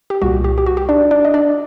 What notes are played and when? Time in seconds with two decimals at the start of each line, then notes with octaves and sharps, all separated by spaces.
0.10 G4
0.22 C2 A#2 G3 F#4
0.44 G4
0.58 G4
0.66 F#4
0.77 G4
0.89 D4 D5
1.11 D4 D5
1.25 D#5
1.34 D4 D5